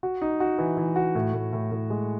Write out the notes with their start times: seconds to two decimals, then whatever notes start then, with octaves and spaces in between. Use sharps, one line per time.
0.03 F#4
0.21 D#4
0.40 F#4
0.58 E3
0.77 E3
0.96 F#4
1.15 A2
1.34 A2
1.53 A2
1.72 A2
1.90 G#3